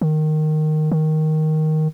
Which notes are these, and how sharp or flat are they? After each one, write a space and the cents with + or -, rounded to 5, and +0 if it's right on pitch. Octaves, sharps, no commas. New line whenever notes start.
D#3 -10
D#3 +5